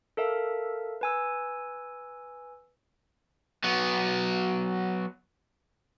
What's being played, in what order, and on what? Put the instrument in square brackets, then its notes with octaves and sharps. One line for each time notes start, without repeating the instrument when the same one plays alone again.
[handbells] A4 A#4 E5 F5
B4 G#5 E6
[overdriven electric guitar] F#3 B3